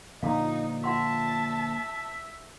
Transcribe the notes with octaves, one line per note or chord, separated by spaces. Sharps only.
A#2 D3 F3 D#4 F5 A#5
F4 E5 F#5 A5 C6